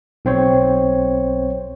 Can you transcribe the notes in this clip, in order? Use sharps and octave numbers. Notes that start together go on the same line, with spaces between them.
B1 C4 C5 C#5